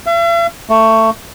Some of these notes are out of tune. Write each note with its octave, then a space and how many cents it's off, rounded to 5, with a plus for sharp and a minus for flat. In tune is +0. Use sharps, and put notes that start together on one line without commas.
E5 +45
A3 +20